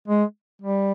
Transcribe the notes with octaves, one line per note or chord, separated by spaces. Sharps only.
G#3
G3